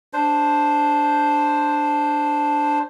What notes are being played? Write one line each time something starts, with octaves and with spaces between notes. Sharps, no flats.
D4 C5